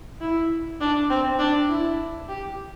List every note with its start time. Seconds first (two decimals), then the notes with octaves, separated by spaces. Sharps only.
0.21 E4
0.80 D4
1.09 C4
1.39 D4
1.69 E4
2.28 G4